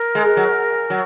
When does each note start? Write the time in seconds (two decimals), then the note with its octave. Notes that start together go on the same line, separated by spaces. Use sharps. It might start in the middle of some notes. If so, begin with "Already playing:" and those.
Already playing: A#4
0.15 G#3
0.37 F#3
0.90 F#3